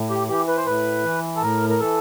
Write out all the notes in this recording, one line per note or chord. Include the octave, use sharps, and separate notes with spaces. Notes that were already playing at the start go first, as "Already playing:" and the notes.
Already playing: A2
G4
E3 G4
B4
C5
A2 B4
E3
A4
A2 A#4
A#4
E3 A4